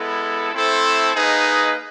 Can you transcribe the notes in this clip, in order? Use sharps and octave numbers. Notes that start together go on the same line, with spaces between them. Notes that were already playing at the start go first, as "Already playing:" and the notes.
Already playing: G#3 B3 E4 A4
A3 C4 E4 A4 C5
A#3 D#4 G#4 B4 D#5